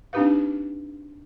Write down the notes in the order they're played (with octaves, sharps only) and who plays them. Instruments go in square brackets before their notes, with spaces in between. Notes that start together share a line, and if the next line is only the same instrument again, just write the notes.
[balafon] C4 D4 D#4 G4 B4 F5